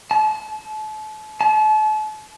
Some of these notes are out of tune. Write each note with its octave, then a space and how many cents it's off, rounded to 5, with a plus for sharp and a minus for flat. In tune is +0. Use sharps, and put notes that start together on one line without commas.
A5 -35
A5 -40